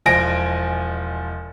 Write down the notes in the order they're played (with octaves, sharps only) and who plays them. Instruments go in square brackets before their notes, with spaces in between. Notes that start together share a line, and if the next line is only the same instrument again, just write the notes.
[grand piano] E1 F3 G#5 A#6 D7